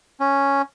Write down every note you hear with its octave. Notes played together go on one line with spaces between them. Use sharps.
C#4